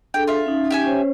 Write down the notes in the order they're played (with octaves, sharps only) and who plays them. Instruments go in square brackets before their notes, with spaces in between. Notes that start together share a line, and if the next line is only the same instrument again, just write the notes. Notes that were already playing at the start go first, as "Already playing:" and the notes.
[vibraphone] D4 G#4 A4 [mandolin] G5
[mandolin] F4 E5
[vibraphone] C#4 D#4
[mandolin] G4 E5 G#5
[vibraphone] C#4 C5 C#5